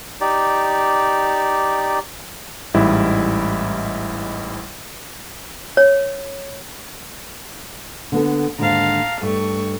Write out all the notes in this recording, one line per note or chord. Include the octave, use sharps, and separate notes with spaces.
D#4 G4 D5
A1 G#2 G3 E4
C#5
D3 B3 A4
D#2 G#2 D3 F5 A5 A#5
G2 A3 C#6